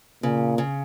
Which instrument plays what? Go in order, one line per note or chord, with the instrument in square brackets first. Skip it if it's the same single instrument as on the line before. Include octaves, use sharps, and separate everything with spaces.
[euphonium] A#2 [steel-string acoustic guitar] C#3
[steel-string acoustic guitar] C#3